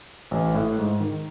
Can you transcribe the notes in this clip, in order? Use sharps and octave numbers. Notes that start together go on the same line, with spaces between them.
A1
A2
G#2
D#3